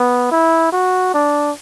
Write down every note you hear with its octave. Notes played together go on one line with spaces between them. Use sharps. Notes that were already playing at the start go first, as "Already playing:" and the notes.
Already playing: B3
E4
F#4
D4